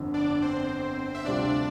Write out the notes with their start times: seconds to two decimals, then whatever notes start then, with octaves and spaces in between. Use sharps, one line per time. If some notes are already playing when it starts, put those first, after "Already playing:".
Already playing: G1 F2 D3
0.14 D4 D5
0.42 C4 C5
1.15 E5
1.25 D2 C3 G3 C4 D4 F4 D5